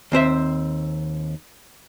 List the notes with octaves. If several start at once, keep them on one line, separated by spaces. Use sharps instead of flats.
D#2 C4 C5 E5